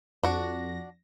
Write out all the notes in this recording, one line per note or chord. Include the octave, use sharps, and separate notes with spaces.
F2 D4 F#4 A#6